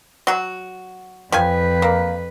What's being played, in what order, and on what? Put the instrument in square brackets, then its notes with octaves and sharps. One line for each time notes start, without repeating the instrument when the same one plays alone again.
[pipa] F#3 F#4
[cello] F2 B4 [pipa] F3 G4 G#5
[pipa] A#3